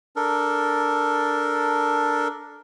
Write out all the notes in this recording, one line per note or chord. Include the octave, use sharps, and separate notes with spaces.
D4 A4 A#4